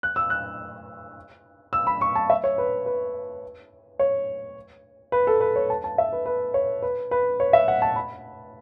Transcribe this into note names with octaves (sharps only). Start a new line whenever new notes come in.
F#6
E6
F#6
E6
B5
C#6
A5
E5
C#5
B4
B4
C#5
B4
A4
B4
C#5
A5
A5
E5
B4
B4
C#5
B4
B4
C#5
E5
F#5
A5
B5